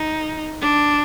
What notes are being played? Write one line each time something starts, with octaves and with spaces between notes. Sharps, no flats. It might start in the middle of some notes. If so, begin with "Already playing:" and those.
Already playing: D#4
D4